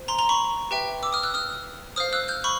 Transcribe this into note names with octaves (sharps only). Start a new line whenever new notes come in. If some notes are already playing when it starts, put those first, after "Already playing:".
Already playing: C5
A#5 C6
A#5 C6
B5 C#6
G4 B4 E5 G5
D6 E6
D#6 F6
E6 F#6
D#6 F6
C5 F5 D#6 F6
E6 F#6
F6 G6
B5 C#6